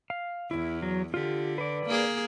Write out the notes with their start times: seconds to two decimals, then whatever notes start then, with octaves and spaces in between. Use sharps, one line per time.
0.10 F5
0.51 E2 E4
0.82 F#3
1.14 D3 F4 G4
1.58 B4 D5
1.86 A#3 G#4